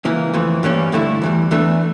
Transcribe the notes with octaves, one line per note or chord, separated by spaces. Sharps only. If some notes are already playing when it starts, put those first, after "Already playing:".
C#2 C#3 E3 A#3
F2 E3 A3
G2 E3 G3 A#3 C#4
G2 D3 A3 E4
E2 E3 G3
E2 E3 A3 D4